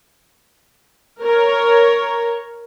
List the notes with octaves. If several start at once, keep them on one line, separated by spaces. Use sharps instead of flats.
A#4 C#5